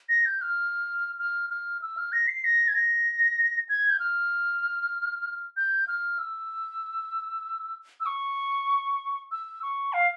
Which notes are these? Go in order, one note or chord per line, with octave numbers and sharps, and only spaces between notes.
A#6
G6
F6
F6
F6
E6
F6
A#6
C7
A#6
G#6
A#6
G#6
G6
F6
G6
F6
E6
E6
C#6
E6
C#6
F5